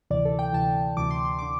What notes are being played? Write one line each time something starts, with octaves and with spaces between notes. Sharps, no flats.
D2 C3 E3 D5
A4
G5
D2 C3 E3 A5
D2 C3 E3 D6
C6
C6
D3 D6